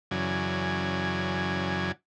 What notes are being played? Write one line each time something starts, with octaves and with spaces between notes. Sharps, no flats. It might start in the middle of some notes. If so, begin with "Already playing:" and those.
F#2 C#3 E3 F#3 D5 G#5